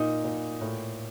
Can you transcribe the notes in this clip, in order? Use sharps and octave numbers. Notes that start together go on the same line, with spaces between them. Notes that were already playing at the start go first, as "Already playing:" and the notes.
Already playing: A#2 D#4
A#2
A2